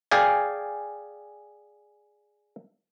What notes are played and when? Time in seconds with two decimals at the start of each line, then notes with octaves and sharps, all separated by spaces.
0.11 G#4 D5 F5 G5 G#5